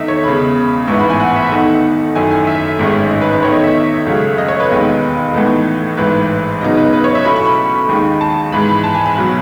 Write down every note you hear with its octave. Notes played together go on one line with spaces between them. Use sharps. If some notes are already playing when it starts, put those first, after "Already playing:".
Already playing: E2 D#3 A3 D#4 D#5 E5
C#5
E1 E2 C#3 B5
A1 G#2 E3 B3 E4 C#6
B5
G#5
F#5
E5
E2 D#3 A3 D#4 F#5
F#2 D#3 A3 E4 G#5
G#5
E5
A1 G#2 D#3 G#3 C#4
D#5
B4
B4
E2 D#3 A3 C#5
D#5
E5
C#2 C#3 F#3 A3
D#5
C#5
B4
E1 D#2 D#3 G#3 D#4
A2 E3 B3 D#4 A4
A1 G#2 E3 B4
E2 C#3 F#3 B3 D#4 D#5
B4
B4
C#5
E5
B1 B2 A3 C#4 E4 B5
C#6
B5
D#2 D#3 G#3 D#4
A5
G#2 E3 G#3 B5
B5
A5
G#5
B5
B1 B2 F#3